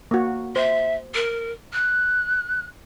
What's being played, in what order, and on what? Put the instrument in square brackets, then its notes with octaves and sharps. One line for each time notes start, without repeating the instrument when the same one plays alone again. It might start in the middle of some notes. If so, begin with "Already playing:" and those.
[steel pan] A#3 F#4
[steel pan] C5 [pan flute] E5
[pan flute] A#4
F#6